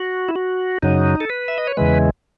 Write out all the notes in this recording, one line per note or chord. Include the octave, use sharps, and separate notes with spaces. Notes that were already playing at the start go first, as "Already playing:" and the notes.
Already playing: F#4
E4
F#4
F#2 C#3 F#3 D#4
A4
B4
E5
D#5
C#5
E2 C#3 E3 G#3 B4